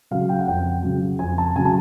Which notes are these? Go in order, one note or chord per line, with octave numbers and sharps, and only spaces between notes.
C#3 F#3 F5
G5
F#5
F2 G5
C#3 F#3
F2 G#5
A5
C#3 F#3 G#5
A5